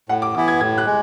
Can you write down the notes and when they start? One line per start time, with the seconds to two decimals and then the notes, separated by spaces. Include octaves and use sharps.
0.09 A2 F#5
0.22 D6
0.35 E3 B3 E4 D6
0.48 G#6
0.60 A2 G#6
0.78 F#6
0.86 G#3